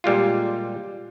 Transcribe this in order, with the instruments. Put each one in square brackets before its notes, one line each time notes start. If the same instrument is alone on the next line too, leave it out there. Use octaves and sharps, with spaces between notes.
[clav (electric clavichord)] A#2 G3 G#3 F4